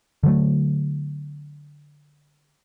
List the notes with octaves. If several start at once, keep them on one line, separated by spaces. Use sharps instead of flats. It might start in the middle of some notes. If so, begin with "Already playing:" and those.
D3 F#3 A3